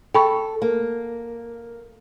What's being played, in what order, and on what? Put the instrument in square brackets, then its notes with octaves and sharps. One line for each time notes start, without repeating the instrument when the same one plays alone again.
[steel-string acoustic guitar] A4 [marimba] G5 B5 C#6
[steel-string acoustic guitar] A#3